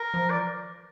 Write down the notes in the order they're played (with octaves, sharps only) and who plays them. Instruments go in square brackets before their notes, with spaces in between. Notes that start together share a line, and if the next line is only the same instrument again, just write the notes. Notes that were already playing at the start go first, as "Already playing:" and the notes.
Already playing: [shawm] A#4
[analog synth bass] F3
[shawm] D5